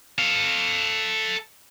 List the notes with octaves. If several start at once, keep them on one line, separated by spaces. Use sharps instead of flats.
A4 F5